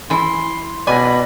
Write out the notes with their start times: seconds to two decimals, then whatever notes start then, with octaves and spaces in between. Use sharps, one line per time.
0.10 E3 E4 C6
0.87 B2 D5 G#5 B5 A#6